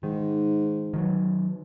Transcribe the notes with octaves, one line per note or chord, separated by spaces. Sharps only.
G#2 D#3
D#3 F3 F#3